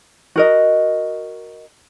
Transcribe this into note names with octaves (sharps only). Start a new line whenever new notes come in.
F#4 A#4 D#5